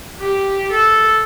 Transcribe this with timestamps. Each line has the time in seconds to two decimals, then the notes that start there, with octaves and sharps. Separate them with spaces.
0.20 G4
0.71 A4